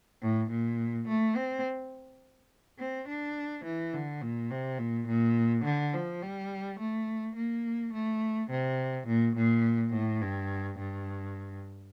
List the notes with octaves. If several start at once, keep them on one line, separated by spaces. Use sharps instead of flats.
A2
A#2
A3
C4
C4
D4
E3
D3
A#2
C3
A#2
A#2
D3
F3
G3
A3
A#3
A3
C3
A#2
A#2
A2
G2
G2